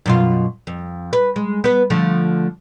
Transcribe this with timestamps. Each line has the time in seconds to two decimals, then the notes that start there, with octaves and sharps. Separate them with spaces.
0.06 F#2 B2 F4
0.67 F2
1.13 B4
1.36 G#3
1.64 B3 B4
1.90 D3 F3 A3